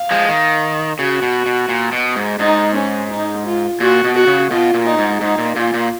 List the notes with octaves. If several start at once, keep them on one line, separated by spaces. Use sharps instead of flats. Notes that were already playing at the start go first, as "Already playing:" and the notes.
Already playing: F5
F3 G#3
D#3
C#3 F#4
B2
B2
A#2
B2
G#2
G#2 D#4
C#4
D#4
F4
A#2 F#4
B2
F#4
C#3
B2 F4
A#2
D#4
G#2
G#2 D#4
A#2
A#2 F4
A#2